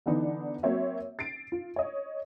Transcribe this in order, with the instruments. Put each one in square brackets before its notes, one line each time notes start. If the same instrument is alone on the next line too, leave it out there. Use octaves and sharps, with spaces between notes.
[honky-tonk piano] D3 E3 B3 D4 D#4
F#3 A#3 C4 C#5 E5
A6 C7 D7
F4
C#5 D#5